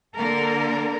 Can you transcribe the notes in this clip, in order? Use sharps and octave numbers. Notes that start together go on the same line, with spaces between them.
D3 A#3 A4 A#4